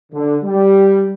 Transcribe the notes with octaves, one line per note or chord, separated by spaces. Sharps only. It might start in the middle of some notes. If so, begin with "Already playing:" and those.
D3
G3